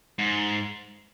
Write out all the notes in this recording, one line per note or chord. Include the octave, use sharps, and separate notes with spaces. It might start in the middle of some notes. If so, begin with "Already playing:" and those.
G#2